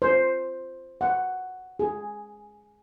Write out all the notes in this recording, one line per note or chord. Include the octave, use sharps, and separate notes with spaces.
C5
F#5
G#4